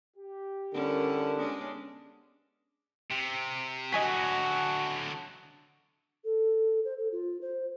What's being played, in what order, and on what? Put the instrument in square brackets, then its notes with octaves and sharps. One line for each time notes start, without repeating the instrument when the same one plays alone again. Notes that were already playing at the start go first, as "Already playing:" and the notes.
[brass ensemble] G4
[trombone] D3 [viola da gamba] G3 C#4 E4 [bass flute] A#4
[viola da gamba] G#3 C#4 D4 [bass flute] B3
[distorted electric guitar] C3
[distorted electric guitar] D3 F#3 [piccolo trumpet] F#4 [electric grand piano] D#5 G#5 B6
[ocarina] A4
C5
A4
F4
C5